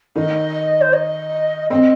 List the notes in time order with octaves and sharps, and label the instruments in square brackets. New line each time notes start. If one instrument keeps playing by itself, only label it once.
[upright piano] D#3 D#4 [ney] D#5
[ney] C5
D#5
[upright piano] C4 [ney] D#5